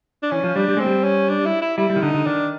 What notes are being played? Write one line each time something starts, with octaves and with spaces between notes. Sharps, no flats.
D4
E3 C#4
F3
G3 D4
G3
G#3 C4
G3
C#4
D4
E4
E4
G3 E4
G3
D#3
D3 D#4
D3
D#3 D4